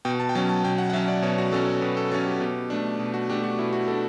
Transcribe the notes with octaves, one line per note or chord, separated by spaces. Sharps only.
B2 G5
A5
G5
F#3 C#4 A5
A5
B2 G5
F#5
F#5
F#3 C#4 E5
D5
B2 C#5
F#4
F#3 C#4 A4
C#5
B2 B4
A4
F#3 C#4 A4
G4
B2 G4
A3 D4
B2
F#4
A3 D4 G4
F#4
B2 E4
F#4
A3 D4 A4